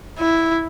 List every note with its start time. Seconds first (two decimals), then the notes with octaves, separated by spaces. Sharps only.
0.19 E4